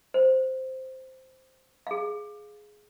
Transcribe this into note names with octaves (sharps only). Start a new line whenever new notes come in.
C5
G#4 F5